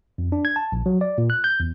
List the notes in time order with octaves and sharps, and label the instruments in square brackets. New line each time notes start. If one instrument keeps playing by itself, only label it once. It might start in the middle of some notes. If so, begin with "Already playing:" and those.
[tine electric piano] F2
D4
G#6
A5
A#1
F#3
D5
A#2
F#6
G6
E2